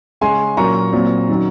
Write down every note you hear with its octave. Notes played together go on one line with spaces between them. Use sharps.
C#3 G#3 C#4 G#5 C6
A#2 F#3 A#3 C#4 A#5 C#6
A#2 F#3 C4
D#3 F#3 C#4